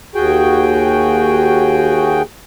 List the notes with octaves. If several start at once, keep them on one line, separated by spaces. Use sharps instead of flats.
D#2 F#4 G#4 G5